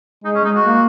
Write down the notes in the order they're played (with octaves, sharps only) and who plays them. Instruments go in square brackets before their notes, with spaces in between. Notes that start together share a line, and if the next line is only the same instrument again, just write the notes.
[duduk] G#3 [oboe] D#4
[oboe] C#4
[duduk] G#3 [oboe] D#4
[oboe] F#4
[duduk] A#3